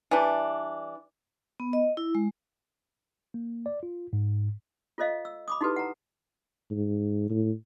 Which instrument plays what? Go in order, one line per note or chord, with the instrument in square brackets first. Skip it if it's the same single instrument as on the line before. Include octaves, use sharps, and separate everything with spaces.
[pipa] E3 G3 D4
[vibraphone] B3
D#5
E4
G#3
[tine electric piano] A#3
D5
F4
G#2
[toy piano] F4 A4 C5 D#5 F5
E6
B5 D6 D#6
D#4 E4 F#4 G4 A4 B4
F#5 A#5
[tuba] G#2
A2